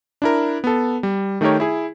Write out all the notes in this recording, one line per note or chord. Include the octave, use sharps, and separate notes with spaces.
D4 E4 A#4
B3 A4
G3
D#3 A3 D#4 G4 A#4 C#5
E4 G#4